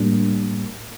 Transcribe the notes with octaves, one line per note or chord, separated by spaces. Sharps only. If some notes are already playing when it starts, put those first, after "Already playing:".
Already playing: A2 G3 A#3 D4